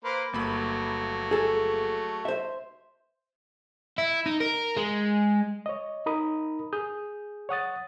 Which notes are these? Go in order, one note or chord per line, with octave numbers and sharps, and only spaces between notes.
A#3 B4 C5
G1 F#3 A3 A#3 B5
G#4 A4
C5 E5
E4
D#4
A#4
G#3
C#5 D#5
D#4 A#4 A#5 B5 D#6
G#4 D#6 G6
C#5 F#5 D#6 A6